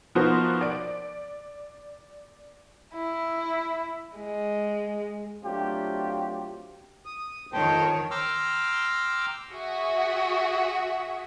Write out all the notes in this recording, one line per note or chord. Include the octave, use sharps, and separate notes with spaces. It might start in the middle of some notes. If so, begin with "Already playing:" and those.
F3 B3 D#4 F#4 A#4 C5
D5 D7
E4
G#3
F#3 A3 C4 D4 F4 G4
D#6
F2 D#3 C5 C#5 G5 A5
G5 A#5 C6 D6 E6 F6
F#4 G#4 E5